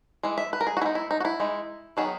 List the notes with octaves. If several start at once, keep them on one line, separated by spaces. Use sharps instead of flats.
E3 G#3
E5
B4
A#4
G#4
F#4
G#3 B3 D#4 E4
E4
D#4
F#4
E4
E3 G#3 D#4
D#3 F#3 B3 D#4 G#4